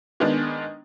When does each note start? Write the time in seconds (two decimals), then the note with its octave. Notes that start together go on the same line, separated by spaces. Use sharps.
0.20 D#3 G#3 B3 D4